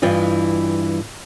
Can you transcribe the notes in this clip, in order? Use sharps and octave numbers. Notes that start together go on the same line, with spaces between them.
G2 E3 F4 D#5